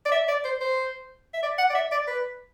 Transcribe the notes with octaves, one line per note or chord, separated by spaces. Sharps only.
D5
E5
D5
C5
C5
E5
D5
F#5
D5
E5
D5
B4